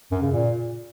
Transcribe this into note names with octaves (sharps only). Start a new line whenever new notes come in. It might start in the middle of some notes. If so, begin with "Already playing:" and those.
F#2
C#3
A#2